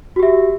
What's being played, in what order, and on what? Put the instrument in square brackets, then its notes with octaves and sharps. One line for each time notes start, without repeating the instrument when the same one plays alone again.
[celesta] F#4
G4
E5